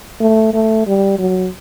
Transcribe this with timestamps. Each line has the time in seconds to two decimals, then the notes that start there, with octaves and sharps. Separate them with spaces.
0.20 A3
0.54 A3
0.87 G3
1.19 F#3